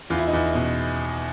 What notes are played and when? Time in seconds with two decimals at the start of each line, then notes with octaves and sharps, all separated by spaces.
0.10 E2 F4
0.18 E4
0.28 D#4
0.33 E2 E4
0.55 B2